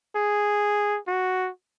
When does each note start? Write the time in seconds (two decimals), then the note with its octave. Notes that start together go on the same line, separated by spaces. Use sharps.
0.16 G#4
1.08 F#4